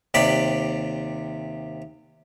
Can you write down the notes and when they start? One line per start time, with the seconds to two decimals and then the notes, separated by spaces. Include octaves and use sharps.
0.14 D#2 C3 D5 B5